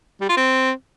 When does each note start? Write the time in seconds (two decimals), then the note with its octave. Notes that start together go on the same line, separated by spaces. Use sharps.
0.21 G3
0.29 F4
0.37 C4